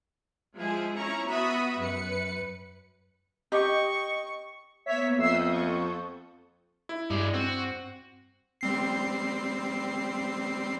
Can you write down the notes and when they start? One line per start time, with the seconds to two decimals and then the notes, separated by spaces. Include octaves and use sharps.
0.56 F3 G#3 E4 G#4
0.95 C#4 E4 A#5 C#6
1.28 B3 F#4 E5 B5 D#6
1.79 F#2 B4 C#7
3.52 G4 D#5 C#6
4.86 A#3 B3 C#5 E5 B6
5.19 F2 E5 F#5 D#6 E6 G6 C7
5.49 A4 C#6
6.89 E4
7.10 G2 G#3 D5
7.34 C4 F#4
8.61 G3 C4 C7